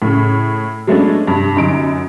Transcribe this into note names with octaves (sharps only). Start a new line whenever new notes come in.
A2 C#3
F#3 G#3 A3 B3 C#4 D4
G2 C3
G1 F#2 D#4 D7